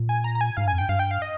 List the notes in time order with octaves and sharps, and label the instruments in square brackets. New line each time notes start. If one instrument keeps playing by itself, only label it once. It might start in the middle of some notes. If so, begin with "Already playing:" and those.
Already playing: [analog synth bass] A#2
[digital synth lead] G#5
A#5
A#5
G#5
[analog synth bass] G#2 [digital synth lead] F5
[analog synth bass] G2 [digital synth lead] G#5
[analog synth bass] F2
[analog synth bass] G2 [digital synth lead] G5
[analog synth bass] G2 [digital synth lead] F5
[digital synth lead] G5
F5
D#5